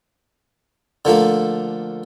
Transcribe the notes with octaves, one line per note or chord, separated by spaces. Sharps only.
D3 F3 A3 A#3